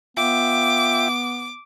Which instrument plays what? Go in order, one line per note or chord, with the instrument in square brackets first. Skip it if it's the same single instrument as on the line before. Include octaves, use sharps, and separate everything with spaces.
[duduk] B3 [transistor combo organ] F4 E5 G5 [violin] D6